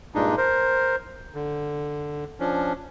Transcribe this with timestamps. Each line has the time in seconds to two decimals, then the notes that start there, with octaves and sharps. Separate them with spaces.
0.15 G2 A#2 G#3 D4 D#4
0.37 A#4 C5
1.35 D3
2.40 F3 C#4 D4